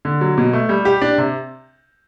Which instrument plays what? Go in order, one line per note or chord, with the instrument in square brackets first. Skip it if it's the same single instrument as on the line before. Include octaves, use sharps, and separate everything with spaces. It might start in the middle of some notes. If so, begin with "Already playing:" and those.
[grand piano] D3
F#3
B2
A3
G3
G4
D4
C3